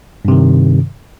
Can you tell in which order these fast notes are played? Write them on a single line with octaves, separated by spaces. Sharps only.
G2 C3 D#3